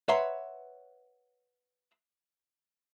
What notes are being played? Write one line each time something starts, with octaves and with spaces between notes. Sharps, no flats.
B4 C#5 E5 F#5 A#5 C6